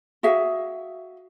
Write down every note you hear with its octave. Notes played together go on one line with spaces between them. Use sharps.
F#4 G#4 E5 F5